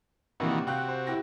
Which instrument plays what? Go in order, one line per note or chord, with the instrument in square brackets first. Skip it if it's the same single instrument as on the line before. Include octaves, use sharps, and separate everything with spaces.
[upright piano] A#1 C3 A#3 [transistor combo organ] D#3 E3 F#4
[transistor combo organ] C3 F#4 [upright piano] F5 G5 F#6
[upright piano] C5
E4 G4 A#6